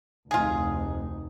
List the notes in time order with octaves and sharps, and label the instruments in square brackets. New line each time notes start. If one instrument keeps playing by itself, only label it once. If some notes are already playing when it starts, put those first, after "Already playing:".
[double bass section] F1 D2 [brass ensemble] D#4 [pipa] F4 G#4